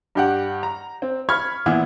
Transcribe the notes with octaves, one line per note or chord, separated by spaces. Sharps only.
G2 G4 F#5
A#5
C4
B5 C#6 F6 G#6
A#2 E3 B3 E4